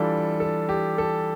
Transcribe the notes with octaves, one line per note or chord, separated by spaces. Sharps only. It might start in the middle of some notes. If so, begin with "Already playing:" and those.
Already playing: E3 G3 D4 F4 A4
A4
G4
A4